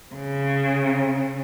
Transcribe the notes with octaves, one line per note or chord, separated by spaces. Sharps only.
C#3